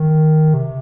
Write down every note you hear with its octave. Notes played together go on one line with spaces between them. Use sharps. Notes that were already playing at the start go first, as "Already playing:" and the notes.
Already playing: D#3
C3